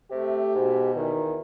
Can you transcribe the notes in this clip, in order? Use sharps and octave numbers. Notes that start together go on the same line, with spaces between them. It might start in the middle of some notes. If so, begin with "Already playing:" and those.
C3 A3 G4
G#2 B2
E2 D#3